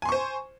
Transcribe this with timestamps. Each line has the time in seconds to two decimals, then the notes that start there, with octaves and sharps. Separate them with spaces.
0.02 G#5
0.05 C6
0.09 C#6
0.12 C5